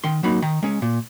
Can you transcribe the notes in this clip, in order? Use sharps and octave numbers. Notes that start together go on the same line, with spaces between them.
D#3 C6
F#3 A#3 D#4 B5
D#3 A#5
G#3 C#4
A#2